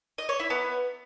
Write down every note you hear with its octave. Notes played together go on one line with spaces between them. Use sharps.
D#5
C#5
E4
B3